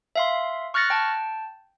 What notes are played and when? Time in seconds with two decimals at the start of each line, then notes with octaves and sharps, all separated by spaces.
0.15 E5 F5 C6
0.74 C#6 F6 F#6 A6 A#6 C#7
0.90 G5 A5